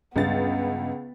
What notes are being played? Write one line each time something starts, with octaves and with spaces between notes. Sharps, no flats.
C#2 G2 B3 A6